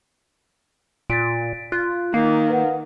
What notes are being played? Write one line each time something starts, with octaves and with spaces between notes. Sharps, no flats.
A#2 A6 B6 D7
F4 F#6
D#3 A#3
B4 F5 F#5